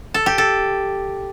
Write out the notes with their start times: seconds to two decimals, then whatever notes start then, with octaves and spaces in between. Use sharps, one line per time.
0.14 A4
0.26 G4
0.38 A4